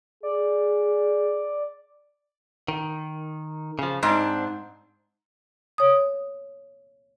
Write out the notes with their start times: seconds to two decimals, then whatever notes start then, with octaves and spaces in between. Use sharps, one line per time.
0.23 G#4 D5
2.68 D#3
3.79 C#3 F3
4.03 G#2 C4 D4
5.78 C#5 D#6